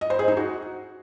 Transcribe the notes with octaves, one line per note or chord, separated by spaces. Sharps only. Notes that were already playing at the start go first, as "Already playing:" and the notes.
D#5
C5
G#4
D#4
F#4